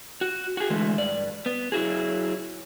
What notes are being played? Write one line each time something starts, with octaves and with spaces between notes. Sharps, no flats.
F#4
F#4 G#4
D3 E3 G#3 A3
G2 D5
B3
F#3 E4 F#4 G#4